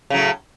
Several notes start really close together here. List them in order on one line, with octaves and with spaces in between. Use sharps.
C#3 F#3 A2